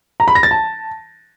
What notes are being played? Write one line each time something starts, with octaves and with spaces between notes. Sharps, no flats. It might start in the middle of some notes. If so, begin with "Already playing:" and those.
A#5
B5
A#6
A6
A5